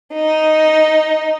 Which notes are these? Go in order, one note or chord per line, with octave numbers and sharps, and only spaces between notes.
D#4